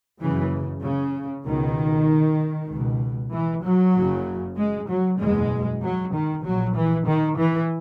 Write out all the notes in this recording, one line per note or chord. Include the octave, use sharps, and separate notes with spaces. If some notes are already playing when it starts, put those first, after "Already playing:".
F#1 F#2 C#3 E3
C#3
C#2 B2 D#3
C#2 B2
E3
F#3
F#1 F#2 C#3
G#3
F#3
F#1 E2 B2 G#3
F#3
D#3
A#1 A#2 F#3
E3
D#3
E3